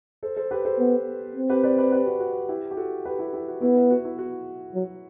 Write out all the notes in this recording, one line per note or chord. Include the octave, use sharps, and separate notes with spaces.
A4 C5
A4 C5
G4 B4
A4 C5
B3
C4
G4 B4
B4 D5
B4 D5
G4 B4
F#4
F#4
E4 G4
G4
F#4 A4
G4 B4
E4 G4
E4 G4
F#4
B3 E4
E4
F#4
E4
F#4
F#3